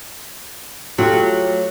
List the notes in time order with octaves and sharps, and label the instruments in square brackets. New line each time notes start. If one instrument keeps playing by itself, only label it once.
[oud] F#3 [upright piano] A3 F4 G4